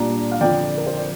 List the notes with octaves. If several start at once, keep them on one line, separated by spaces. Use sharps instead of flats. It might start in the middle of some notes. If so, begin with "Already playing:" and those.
Already playing: A#2 G3 A#3 D4 A#5
F5
F2 D3 F3 C4 D5 G5
A#4
C5
D5